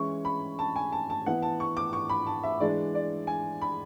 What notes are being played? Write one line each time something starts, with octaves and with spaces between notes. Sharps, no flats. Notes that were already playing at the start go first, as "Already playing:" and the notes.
Already playing: E3 G#3 C#4 E4 C#6
B5
A5
G#5
A5
A5
E3 B3 E4 F#5
A5
C#6
D6
C#6
B5
A5
E5
E3 G#3 D4 D5
D5
G#5
B5